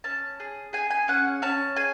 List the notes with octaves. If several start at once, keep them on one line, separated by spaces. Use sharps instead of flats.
C#4 A5
G#4
G#4 G#5
G#5
C#4 F#5
C#4 A5
G#4 G#5